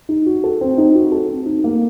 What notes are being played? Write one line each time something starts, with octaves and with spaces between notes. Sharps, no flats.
D#4
F#4
A4
C4
D#4
F#4
A4
C4
D#4
A#3